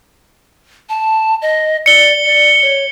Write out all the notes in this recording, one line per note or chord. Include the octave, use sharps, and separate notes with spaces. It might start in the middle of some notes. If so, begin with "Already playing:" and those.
A5
D#5
D5 C#7 G7
D5
C#5